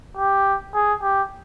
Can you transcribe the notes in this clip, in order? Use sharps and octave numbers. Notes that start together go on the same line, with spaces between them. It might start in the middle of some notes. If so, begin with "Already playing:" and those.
G4
G#4
G4